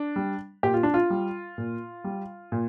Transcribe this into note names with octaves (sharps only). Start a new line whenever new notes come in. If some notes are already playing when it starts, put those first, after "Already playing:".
Already playing: D4
G3
A#2 G4
F4
D4
F4
G3
A#2
G3
A#2